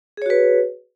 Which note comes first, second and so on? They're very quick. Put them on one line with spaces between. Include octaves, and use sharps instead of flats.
G#4 C#5 F#4 B4